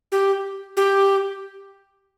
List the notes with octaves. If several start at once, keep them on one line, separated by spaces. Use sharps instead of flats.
G4
G4